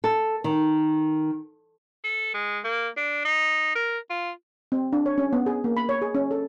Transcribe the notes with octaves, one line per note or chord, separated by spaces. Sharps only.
A4
D#3
A4
G#3
A#3
D4
D#4
A#4
F4
C4
D4
C#5
C#4
B3
G#4
A#3
B5
C#5
G#4
C#4
A4